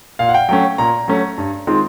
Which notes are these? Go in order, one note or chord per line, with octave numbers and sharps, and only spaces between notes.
A#2 F5
F#5
G5
F#3 A3 C#4 G5
A#2 A#5
F#3 A3 C#4
G2
D#3 G#3 C4 F4